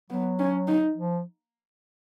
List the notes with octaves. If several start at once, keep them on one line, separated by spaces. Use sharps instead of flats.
F#3 B3
C#4
D#4
F3